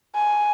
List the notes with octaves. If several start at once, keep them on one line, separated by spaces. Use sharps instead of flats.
G#5